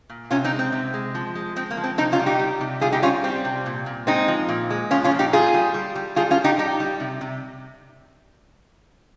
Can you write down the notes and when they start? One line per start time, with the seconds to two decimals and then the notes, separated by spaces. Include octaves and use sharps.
0.10 A#2
0.31 C3 C#4 F4
0.44 C4 D#4
0.52 G#3
0.59 C4
0.72 C3
0.94 G#3
1.15 F3
1.35 G#3
1.56 G#3 C4
1.71 A#3
1.77 F3
1.84 C4
1.98 C3 C4 D#4
2.12 C#4 F4
2.19 G3
2.26 D#4 G4
2.39 G3
2.61 C3
2.81 G3 F4 G#4
2.92 D#4 G4
3.02 G3 C#4 F4
3.24 G3 C4
3.45 C3
3.66 A#2
3.86 A#2
4.07 G#3 C4 D#4
4.28 F3
4.49 A#2
4.70 G#3
4.91 F3 C#4 F4
5.04 C#4 F4
5.11 A#2
5.19 D#4 G4
5.33 G3 F4 G#4
5.54 G3
5.74 G3
5.95 G3
6.16 G3 F4 G#4
6.31 C#4 F4
6.37 G3
6.44 D#4 G4
6.58 G3 D#4 G4
6.80 G3
7.00 C3
7.21 C3